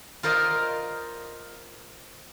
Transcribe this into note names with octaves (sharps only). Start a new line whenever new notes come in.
F4 A#4 C5 D5 D#5 F5